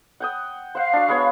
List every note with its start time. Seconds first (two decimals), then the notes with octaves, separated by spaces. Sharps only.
0.20 F#5 G5 D#6
0.75 C5 F5 F#5
0.93 D4 F#4
1.08 G#3 B3 C#5